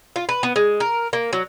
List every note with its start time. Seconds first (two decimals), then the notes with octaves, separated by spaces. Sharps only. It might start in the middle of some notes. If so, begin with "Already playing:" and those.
0.16 F4
0.29 B4
0.43 B3
0.56 G#3
0.80 A#4
1.13 A#3
1.33 F#3